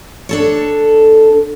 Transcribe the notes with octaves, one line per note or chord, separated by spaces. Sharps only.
D4 A4 C#5